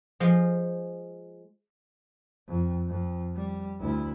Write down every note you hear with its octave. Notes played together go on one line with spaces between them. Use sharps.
F3 G#3
F2
F2
G3
D2 E4